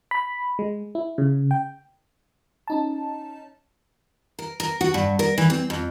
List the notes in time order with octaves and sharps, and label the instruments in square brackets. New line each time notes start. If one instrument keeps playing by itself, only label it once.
[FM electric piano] B5
G#3
E4
C#3
G5
C#4 D#4 A5
[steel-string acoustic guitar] A#4
A#4
F#4
G2
A#4
E3
C4
F2